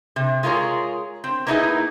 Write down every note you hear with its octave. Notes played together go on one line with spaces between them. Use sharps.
C3
G#3 F4 G#4 A#4 C#5
C4
A#3 B3 D#4 E4 G#4 D#5